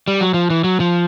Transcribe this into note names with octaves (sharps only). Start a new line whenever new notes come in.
G3
F#3
F3
E3
F#3
F3